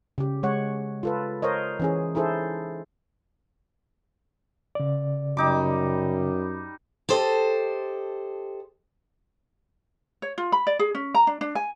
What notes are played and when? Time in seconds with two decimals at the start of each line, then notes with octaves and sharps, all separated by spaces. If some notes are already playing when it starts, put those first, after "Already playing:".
0.18 C#3 G4
0.43 G#3 C#5 F#5
1.03 F4 A4 B4
1.42 A#4 C5 C#5 D#5
1.80 E3 C#4 G#4
2.15 D#4 E4 G#4 A4 C5
4.75 C#3 D5
5.37 F#2 G3 D#4 D6
7.09 G4 A4 C5 D#5
10.22 C#5
10.38 F4
10.52 B5
10.67 D5
10.79 G#4
10.95 C#4
11.15 A#5
11.27 D4
11.41 D4
11.55 G#5